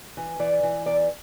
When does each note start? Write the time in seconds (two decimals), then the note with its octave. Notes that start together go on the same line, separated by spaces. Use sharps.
0.17 E3
0.39 E3 D5
0.63 E3
0.86 E2 D5